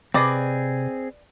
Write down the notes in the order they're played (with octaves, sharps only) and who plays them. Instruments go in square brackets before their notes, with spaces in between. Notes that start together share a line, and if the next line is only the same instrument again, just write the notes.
[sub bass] C3 [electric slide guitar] C4 G#4 [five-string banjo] B4 D5 D#5